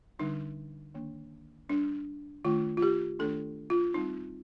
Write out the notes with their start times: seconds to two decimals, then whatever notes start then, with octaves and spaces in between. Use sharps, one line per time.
0.19 D3 G3 D4 D#4
0.94 D#3 A#3 D4
1.69 G3 D4
2.45 D#3 A3 D4 F4
2.77 F4
2.82 G4
3.19 D#3 A3 D4 A4
3.70 F4
3.94 G3 C4 D#4